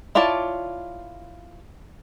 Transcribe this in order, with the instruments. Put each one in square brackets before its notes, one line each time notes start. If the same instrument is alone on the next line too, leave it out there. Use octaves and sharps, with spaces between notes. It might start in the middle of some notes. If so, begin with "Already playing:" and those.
[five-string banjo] E4 F4 C#5 D5 A5